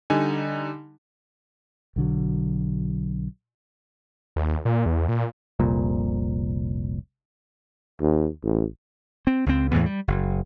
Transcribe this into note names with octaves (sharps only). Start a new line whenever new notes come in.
D3 G3 D#4 G#5
B1 D3 F#3
D#2
A#2
E2
A#2
F1 C2 A#2
D#2
A1
C4
C#2 C4
E2 A2 E3 B3
G3
F#1